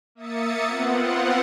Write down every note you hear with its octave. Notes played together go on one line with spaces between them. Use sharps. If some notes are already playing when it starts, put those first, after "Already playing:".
A#3 E5 D#6 A6 C#7
B3 C4 F4 F#5